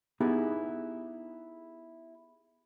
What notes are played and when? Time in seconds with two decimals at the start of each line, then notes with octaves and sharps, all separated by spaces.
0.20 B3 D#4 E4 G4 G#4